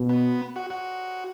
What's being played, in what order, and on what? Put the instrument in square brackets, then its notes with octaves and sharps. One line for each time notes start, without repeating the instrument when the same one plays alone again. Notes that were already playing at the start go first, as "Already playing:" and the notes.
Already playing: [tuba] B2
[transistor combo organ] B3
F#4
F#4